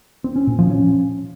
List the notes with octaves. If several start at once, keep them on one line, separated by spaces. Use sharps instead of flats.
C4
C#4
A#2
F3
C#4